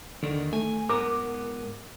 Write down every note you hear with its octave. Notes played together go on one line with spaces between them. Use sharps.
D#2 D3 D#3
A3 G#5
G#2 B3 A#4 D6